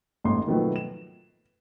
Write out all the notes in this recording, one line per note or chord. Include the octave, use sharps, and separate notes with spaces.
A1 G#2 C6
B2 D#3 F3 F#3 A3 B3
E7